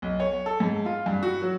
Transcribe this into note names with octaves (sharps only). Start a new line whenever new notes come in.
B1
C#5
A4
G#2
F4
G2
F#4
F#3